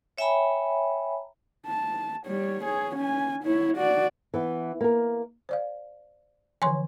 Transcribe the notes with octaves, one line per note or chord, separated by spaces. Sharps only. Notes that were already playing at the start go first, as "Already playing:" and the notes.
C#5 E5 G5 G#5 A#5 B5
A5
G3 C#5
G#4 C#5
C#4 G#5
E4 C#5
F#4 D5
E3 B3
A#3 A#4
C5 D5 F5
D3 E3 F3 G#5 C6